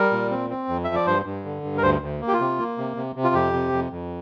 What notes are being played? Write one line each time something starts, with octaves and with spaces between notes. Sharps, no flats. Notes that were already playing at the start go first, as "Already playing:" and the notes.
Already playing: G3 A#4
A#2
C4
C4
F2
F3 E5
D5
G2 C5
G2
D3
G2
A#4
D2 C5
D2
A#3
G4
F4
C3
A#3
C3
C3
C3
F4
F2 G4
C3
F2
F2